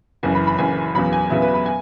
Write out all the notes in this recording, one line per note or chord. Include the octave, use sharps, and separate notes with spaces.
F#1 F#2 E3 G#5
B5
B5
F#1 F#2 E3 G#5
E2 C#3 F#3 B3 B5
G#5
E2 C#3 F#3 B3 E5
B4
B5
G#5